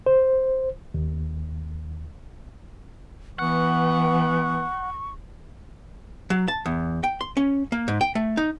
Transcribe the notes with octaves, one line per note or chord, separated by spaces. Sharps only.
C5
D#2
E3 B3 F#5 C#6
F#3
A5
E2
G5
C6
C#4
A#3
G#2
G5
A3
D#4